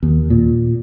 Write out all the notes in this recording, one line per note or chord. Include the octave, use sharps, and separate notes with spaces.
D#2
A#2